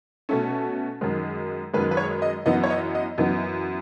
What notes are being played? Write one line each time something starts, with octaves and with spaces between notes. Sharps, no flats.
B2 A3 C#4 A4
F#2 D#3 G#3
F#2 D#3 G#3 B4
B4
C#5
D#5
F#2 E3 B3 D#5
C#5
D#5
D#5
F#2 E3 B3 D#5